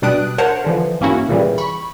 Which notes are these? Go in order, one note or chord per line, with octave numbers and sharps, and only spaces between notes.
B2 G3 D4 D#6 F#6 D7
A#4 C5 C#5 F#5 A5
D3 E3 F3
G#2 A#3 C#4 E4 F#4
A#2 C#3 E3 G3
B5 C#6